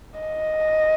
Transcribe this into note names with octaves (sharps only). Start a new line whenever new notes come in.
D#5